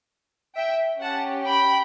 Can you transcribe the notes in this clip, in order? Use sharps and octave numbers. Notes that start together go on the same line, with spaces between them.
E5 G5
C#4 G4 F#5 A5
G5 B5